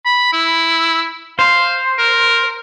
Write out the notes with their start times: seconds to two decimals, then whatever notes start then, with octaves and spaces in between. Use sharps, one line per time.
0.05 B5
0.33 E4
1.39 C5 F5
1.99 A#4